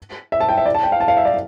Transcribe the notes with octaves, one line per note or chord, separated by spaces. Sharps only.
E5
A5
G5
E5
D5
A5
G5
F5
A5
F5
E5
D5